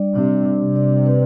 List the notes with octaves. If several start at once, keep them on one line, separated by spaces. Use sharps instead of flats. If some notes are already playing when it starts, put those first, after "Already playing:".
Already playing: G3 D4 D5
C3 D4
D4
C3
D5
B4